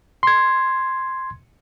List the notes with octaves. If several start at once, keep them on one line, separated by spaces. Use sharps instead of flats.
C6 G#6